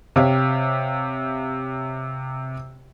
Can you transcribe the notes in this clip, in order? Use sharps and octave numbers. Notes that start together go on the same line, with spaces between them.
C3 G4 C#5 F5